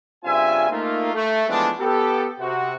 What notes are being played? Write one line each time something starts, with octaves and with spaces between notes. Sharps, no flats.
G2 C#3 C4 F4 E5 G#5
A3 A#3 D#4 F4
A3
E3 F3 G#3 A3 B3 D4
B3 G4 A4
C3 F#4